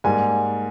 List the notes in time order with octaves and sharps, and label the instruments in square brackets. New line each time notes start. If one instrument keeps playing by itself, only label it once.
[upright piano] G#2 G3 A#3 G#5